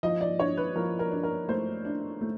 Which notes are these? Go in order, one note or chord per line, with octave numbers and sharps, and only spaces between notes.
F3 D#5
D5
D4 C#5
B4
F3 A#4
A#4
D4
A#4
A3 C5
D4
A3